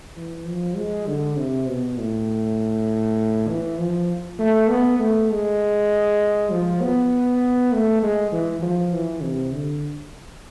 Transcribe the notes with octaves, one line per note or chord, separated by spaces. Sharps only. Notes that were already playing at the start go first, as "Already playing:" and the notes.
E3
F3
G#3
D3
C3
B2
A2
E3
F3
A3
B3
A3
G#3
F3
B3
A3
G#3
E3
F3
E3
C3
D3